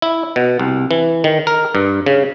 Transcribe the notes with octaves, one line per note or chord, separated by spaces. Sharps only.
E4
B2
C2
E3
D#3
A#4
G2
C#3